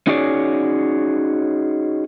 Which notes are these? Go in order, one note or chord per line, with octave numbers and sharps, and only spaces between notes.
C#4 D#4 F#4 G#4 C#5 D5